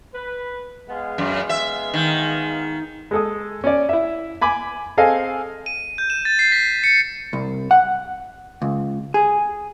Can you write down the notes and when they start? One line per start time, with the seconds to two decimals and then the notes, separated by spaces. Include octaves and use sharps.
0.13 B4
0.89 G#3 B3 F5
1.18 F#2
1.49 E5
1.94 D#3
3.11 G#3 A4 D#6
3.64 C#4 D5
3.89 E4 E5
4.42 G#5 B5 D6
4.97 C4 G#4 A4 D#5 F5 G#5
5.66 D#7
5.98 G6
6.10 E7
6.25 A6
6.39 C7
6.52 B6
6.84 C#7
7.33 C2
7.71 F#5
8.62 C#2
9.14 G#4